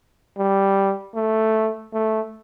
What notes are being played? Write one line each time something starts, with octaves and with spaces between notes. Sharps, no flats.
G3
A3
A3